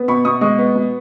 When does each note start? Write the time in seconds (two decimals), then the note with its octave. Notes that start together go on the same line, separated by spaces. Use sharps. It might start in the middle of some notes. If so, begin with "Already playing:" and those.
Already playing: B3
0.08 B2 B5 C#6
0.25 B2 C#6 D#6
0.41 G#3 C#6 D#6
0.59 B3
0.75 B2